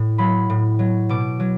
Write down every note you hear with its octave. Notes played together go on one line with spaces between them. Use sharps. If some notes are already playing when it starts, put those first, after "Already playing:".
Already playing: A2
F#3 B5
A2
F#3
B2 D6
F#3